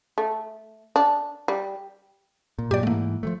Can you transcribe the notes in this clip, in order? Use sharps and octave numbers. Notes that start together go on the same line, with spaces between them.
A3
D4
G3
A#2
G2 A#2 F#3 G4 D5
G#2 E3 A3 A#3
F3 F#3 A3